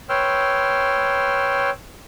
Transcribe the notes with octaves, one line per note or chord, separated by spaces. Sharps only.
B4 C#5 G5 C6 E6 F6